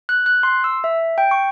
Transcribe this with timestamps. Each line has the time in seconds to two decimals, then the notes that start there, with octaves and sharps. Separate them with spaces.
0.09 F#6
0.26 F#6
0.43 C6
0.64 E6
0.84 E5
1.18 G5
1.31 C#6